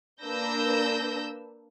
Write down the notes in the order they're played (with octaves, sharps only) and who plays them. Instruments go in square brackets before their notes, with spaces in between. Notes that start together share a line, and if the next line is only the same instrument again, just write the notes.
[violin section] A#3 D4 B4 E6 G6 A#6